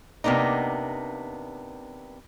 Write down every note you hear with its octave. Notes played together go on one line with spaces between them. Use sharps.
C3 A#3 B3 D4 D#4